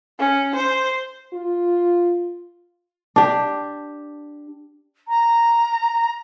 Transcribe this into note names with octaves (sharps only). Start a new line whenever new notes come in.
C#4
C5
F4
D4 G4
A#5